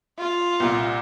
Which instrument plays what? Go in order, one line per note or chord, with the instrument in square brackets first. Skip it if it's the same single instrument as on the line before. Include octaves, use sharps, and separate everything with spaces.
[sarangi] F4
[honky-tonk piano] C2 A#2